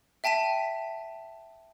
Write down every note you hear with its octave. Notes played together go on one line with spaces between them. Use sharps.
E5 G5 A5 B6 D#7